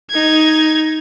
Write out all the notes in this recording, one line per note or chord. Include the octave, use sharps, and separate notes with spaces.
D#4 G#6